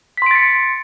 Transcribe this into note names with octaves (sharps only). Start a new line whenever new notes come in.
C6 A6 B6 C#7 D7